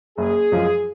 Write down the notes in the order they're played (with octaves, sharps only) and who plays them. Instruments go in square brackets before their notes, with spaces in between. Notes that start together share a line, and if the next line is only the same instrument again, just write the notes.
[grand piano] F#1 [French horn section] G#4
[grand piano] F#2 F3 G#3